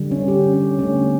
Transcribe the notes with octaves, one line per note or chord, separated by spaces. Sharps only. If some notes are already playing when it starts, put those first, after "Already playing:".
Already playing: D3 G3
C#4
G4
C#4
D3 A3 C#4
B3